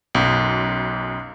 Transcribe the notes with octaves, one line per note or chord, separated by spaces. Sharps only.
B1 F#2